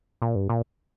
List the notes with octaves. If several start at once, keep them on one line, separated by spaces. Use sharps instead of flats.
A#2
G2
A#2